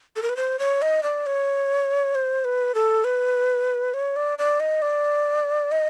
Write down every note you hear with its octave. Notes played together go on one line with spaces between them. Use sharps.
A4
A#4
B4
C5
C#5
D#5
D5
C#5
C5
B4
A4
B4
C#5
D5
D5
D#5
D5
D#5